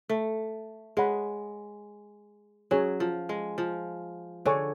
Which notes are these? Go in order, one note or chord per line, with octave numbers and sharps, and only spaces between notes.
A3
G#3 G#4 C#5 F#5 B5
F#3 C#4 G#4 C#5 G#5
F3
G#3
F3
D3 G#4 C#5 G#5 C#6